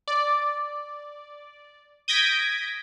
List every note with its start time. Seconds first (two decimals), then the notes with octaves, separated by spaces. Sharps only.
0.08 D5
2.08 D#6 G6 G#6 A#6 B6 D7